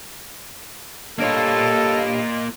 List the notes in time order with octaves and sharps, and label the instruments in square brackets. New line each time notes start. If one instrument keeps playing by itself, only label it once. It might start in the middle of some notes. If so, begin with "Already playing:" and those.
[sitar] G2 C#5 [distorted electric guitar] A#3 F4 [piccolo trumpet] A4 [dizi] D#5